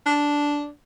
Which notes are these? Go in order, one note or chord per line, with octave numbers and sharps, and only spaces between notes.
D4